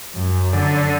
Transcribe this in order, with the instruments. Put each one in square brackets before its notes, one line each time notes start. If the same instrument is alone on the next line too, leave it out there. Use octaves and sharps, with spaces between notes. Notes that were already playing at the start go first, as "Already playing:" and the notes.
[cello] F#2
D3